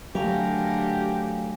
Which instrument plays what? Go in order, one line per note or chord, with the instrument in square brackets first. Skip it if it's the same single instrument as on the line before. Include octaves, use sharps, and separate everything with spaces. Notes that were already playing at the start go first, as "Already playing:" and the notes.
[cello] D3 A#4 [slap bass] F#3 A3 [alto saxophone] G4 [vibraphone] F5 G#5